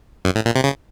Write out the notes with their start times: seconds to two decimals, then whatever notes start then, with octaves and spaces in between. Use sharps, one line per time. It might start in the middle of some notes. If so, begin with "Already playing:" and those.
0.25 F#2
0.35 A2
0.45 A#2
0.55 C3
0.64 C#3